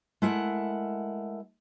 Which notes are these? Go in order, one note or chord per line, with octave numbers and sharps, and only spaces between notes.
G#3 A3 E4 A#4 F#5